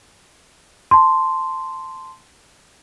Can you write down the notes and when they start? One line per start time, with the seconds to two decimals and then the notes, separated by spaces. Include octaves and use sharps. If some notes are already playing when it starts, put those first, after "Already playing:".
0.91 A5 C6